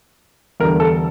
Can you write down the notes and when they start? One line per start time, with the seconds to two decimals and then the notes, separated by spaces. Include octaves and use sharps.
0.60 E2 D3 G3 A#4
0.80 A4